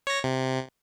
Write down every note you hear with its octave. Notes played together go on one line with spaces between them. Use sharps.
C#5 A#6
C3